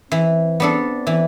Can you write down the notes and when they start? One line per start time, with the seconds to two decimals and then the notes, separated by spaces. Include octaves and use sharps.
0.12 E3 C4
0.60 B3 D4 A4
1.07 E3